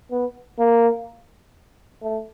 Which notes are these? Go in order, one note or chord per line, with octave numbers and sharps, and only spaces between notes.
B3
A#3
A3